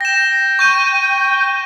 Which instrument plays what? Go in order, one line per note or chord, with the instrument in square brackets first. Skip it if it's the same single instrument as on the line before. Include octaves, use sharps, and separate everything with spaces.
[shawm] G5 [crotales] A#6 E7
[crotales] C#6 G6 D#7